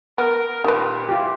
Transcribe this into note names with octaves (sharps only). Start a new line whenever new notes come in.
B3 A#4
A#2 D#3 G4 B4
E3 F4 G4